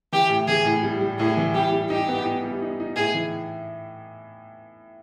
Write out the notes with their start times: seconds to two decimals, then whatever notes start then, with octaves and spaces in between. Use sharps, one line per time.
0.13 E3 G4
0.30 A2
0.48 E3 G#4
0.65 A2
0.83 G3
1.01 G3
1.19 A2 G#4
1.37 E3
1.55 G3 G4
1.72 G3
1.90 D#4 G4
2.09 B3
2.25 D#4
2.44 G3
2.62 D#4
2.80 D#4
2.96 A2 G#4
3.14 E3